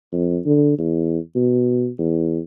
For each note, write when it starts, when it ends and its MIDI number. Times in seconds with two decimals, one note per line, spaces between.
0.12 0.39 41
0.45 0.75 50
0.78 1.18 40
1.35 1.89 47
1.99 2.39 40